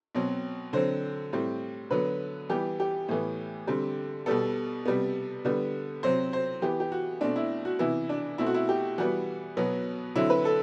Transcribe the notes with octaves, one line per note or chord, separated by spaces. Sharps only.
B2 F#3 C4
D3 F#3 C4 C5
A2 G3 C4
D3 F#3 B3 B4
E3 G3 B3 G4
G4
A2 E3 B3
D3 G3 C4
B2 G3 B3 A4
C3 G3 B3
D3 G3 B3
C3 F#3 C4 C5
C5
E3 B3 G4
G4
F#4
B2 A3 C4 D4
E4
F#4
C3 E3 B3 E4
D4
B2 A3 C4 E4
F#4
E4
G4
E3 G3 B3 F#4
B2 F#3 B3
D3 F#3 C4 E4
B4
A4